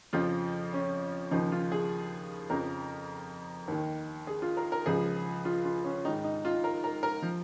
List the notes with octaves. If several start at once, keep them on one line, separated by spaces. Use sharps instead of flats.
F2 C#3 F3 F4
C#4
D#2 C#3 F3 D#4
F4
G#4
F2 C#3 F3 A#4
D#2 D#3
G#4
F4
A#4
A#4
C#2 C#3 F3 G#4
F4
F4
C#4
G#2 D#3 D#4
D#4
F4
A#4
A#4
A#4
F3